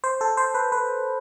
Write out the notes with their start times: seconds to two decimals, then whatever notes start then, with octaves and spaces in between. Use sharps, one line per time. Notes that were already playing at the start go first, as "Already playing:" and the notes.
0.04 C5
0.21 A4
0.37 C5
0.54 B4
0.72 B4